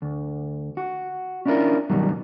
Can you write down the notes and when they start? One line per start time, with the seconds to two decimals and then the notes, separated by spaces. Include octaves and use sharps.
0.02 D2
0.77 F#4
1.46 C#4 D4 E4 F4 A#4
1.90 G2 B2 D#3 F#3 G3